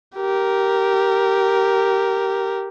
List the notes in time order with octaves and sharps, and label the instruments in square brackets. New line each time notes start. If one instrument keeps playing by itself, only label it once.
[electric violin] G4 A#4